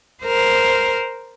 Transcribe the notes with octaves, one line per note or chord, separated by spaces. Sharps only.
A#4 C5